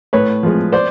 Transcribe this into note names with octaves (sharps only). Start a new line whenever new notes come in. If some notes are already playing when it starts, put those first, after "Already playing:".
A2 B4 C#5
F3 G#3
C5 D5